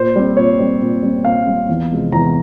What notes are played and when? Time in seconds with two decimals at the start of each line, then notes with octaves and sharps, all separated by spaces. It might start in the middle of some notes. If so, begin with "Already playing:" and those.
Already playing: A#2 C5
0.16 G3 C4
0.37 A#2 C#5
0.59 G3 C4
0.81 A#2
1.03 G3 C4
1.25 A#2 F5
1.47 G3 C4
1.69 E2
1.91 C3 F3 G#3
2.12 E2 A#5